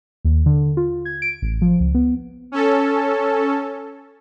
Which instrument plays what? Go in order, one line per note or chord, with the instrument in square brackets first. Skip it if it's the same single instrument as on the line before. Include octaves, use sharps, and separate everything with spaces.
[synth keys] D#2
D3
F4
G#6
D7
A1
F3
C#2
B3
[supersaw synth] C#4 A4